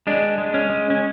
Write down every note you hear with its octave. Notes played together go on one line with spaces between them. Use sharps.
G#3 D4
G#3
C#4
G#3
C#4